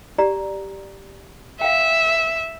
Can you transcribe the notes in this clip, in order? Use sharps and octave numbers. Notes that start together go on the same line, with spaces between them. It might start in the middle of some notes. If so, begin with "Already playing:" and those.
G4 D5 A#5
E5 F5 G5